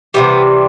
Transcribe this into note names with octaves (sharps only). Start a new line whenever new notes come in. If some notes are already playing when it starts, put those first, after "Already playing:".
C3 E3 G3 B3